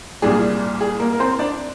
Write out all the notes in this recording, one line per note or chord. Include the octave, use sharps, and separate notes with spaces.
C2 A#2 G3 D4 G#4
G#4
A#3 A#4
A#4
C4 C5
D4 D5